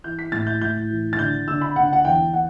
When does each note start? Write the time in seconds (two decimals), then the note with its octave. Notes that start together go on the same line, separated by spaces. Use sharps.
0.04 E3 G6
0.19 B6
0.32 A2 A6
0.47 G6
0.61 A2 G6
0.90 E3
1.13 A6
1.19 D3 G6
1.48 D3 E6
1.61 B5
1.76 D3 F#5
1.93 F#5
2.05 E2 G5
2.34 F#5